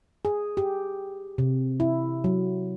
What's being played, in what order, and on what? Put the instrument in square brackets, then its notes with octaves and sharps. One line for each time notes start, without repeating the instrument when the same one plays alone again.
[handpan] G#4
G4
C3
E4
F#3